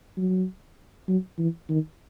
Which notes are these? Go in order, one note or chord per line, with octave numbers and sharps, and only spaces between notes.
F#3
F#3
E3
D#3